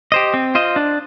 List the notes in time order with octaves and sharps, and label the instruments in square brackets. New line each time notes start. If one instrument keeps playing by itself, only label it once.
[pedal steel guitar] G4 C5 D#5
C4
F4 C5 D#5
D4